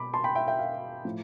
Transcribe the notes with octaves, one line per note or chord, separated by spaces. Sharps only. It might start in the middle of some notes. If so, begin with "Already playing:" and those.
Already playing: B2 B5 D6
A5 C6
G5 B5
E5 G5
E5 G5
F5
A2 F3